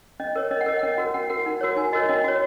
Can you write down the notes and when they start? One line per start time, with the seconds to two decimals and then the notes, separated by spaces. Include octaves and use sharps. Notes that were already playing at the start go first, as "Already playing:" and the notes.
0.20 C#4 D#5
0.36 A#4 C#5
0.51 C#4 D#5
0.61 F#5
0.66 A#4 C#5 D#5
0.79 F#5
0.83 C#4 D#5
0.98 F#4 A#4
1.14 C#4 F#5
1.29 F#4 A#4 F#5
1.46 D#4
1.61 F#4 A#4 C#5
1.76 D#4 G#5
1.93 F#4 A#4 C#5 D#5
2.09 C#4 D#5
2.24 F#4 C#5